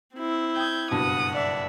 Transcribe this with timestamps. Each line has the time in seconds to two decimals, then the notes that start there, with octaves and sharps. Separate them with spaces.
0.14 C4 E4
0.56 G5 D#6 G6 G#6
0.91 F#1 G2 B2 F#5 D#6
1.36 D5 E5